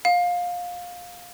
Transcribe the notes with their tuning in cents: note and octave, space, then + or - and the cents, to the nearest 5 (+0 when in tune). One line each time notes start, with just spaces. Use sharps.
F5 +20